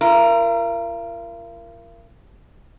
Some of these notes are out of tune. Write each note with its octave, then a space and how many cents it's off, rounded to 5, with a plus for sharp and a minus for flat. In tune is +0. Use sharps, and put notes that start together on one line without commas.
F4 -45 A#4 +0